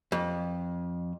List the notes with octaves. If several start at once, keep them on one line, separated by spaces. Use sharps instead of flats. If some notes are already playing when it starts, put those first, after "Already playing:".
F2